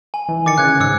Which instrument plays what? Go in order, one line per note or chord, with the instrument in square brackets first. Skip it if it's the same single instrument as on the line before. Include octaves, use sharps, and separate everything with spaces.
[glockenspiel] G#5
[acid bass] E3
[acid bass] D#3 [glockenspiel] D6 A6 C#7
[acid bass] C#3 [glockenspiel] F#6 G#6
[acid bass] G#2 [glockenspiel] D6 E6 C#7